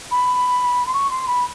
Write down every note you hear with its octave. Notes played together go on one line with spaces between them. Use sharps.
B5
C6
C#6
C6
B5